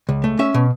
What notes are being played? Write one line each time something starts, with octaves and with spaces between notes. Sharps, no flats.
C#2
A3
C#4 E5
B2